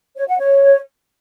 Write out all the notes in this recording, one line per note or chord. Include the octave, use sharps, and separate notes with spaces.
C#5
F#5
C#5